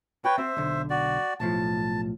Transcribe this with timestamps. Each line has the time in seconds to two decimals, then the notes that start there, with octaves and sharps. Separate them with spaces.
0.25 F#4 B4 C#5 G5
0.38 C4 C5 E5
0.57 B1 D3
0.90 F#4 D5
1.40 B1 A2 F3 A5